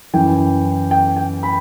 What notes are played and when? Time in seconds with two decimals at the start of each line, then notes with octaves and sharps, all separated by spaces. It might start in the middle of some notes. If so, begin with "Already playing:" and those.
0.14 F#2 E3 G5
0.91 G5
1.16 G5
1.43 B5